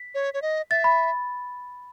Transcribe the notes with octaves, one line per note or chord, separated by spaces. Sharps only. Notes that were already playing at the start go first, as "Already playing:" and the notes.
Already playing: B6
C#5
C#5
D#5
E5 A6
B5